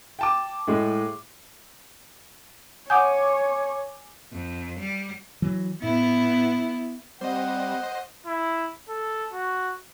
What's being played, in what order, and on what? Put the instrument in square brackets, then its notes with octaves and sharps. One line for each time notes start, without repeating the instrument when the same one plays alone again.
[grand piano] G5 A5 D6
A2 G#3
[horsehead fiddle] C#5 [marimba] F#5 D#6 G6 [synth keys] G#5 D6
[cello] F2
G3
[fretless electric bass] E3 F#3
[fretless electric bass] A2 [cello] B3 E4
[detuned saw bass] G3 [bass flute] C4 [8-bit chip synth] C5 D#5 [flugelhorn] F#5
[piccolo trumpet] E4
A4
F#4